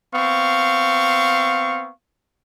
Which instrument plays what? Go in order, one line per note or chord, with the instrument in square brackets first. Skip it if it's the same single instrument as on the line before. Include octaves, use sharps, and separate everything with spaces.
[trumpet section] B3 C4 F5 C#6